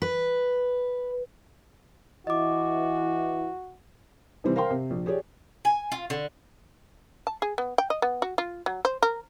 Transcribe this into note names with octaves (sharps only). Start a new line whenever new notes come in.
B4
E3 E4 F#4 D#5 D6
C3 D#3 E3 G3 C4
A#4 C5 F5 G5 C6
C3
A#1
G4 G#4 C#5 D5
G#5
F4
D3
A5
G#4
B3
G5
D#5
B3
F#4
F4
F#3
C5
A#4